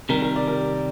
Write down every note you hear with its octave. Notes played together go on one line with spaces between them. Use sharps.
C3 D#3 G3 A#4
A#4
D5
A#4